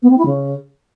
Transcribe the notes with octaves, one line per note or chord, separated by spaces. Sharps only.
B3
C4
E4
C#3